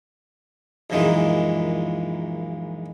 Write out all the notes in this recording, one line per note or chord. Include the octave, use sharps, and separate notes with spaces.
A#1 F#2 A#2 D#3 E3 G#3